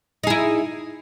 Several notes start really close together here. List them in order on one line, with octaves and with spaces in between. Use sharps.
D#4 G#4 E4